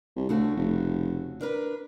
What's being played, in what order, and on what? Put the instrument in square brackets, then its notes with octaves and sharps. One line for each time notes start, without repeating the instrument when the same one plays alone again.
[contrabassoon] C2
[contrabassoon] D2 [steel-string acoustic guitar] C#3 A3 F#4
[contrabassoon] F1
[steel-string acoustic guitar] D4 A#4 B4